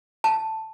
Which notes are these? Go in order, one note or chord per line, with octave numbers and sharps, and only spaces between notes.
A5